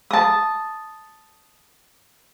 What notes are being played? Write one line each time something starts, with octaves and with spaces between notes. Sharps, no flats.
A5 D#6